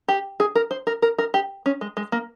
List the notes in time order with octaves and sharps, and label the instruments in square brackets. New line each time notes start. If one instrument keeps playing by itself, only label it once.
[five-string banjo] G4
G#4
A#4
C5
A#4
A#4
A#4
G4
C#4
G#3
G#3
A#3